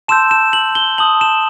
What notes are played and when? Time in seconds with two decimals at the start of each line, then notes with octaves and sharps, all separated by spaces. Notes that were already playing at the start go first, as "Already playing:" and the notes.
0.08 A5 C6 E6 G6 E7
0.31 E7
0.53 F#7
0.75 G7
0.98 A5 D#6 G6 F#7
1.21 E7